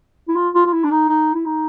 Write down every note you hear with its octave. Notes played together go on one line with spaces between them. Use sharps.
E4
F4
F4
F4
E4
D4
D#4
D#4
E4
D#4